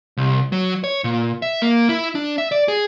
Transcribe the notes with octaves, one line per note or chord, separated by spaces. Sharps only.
C2
F#3
C#5
A#2
E5
A#3
E4
D4
E5
D5
G#4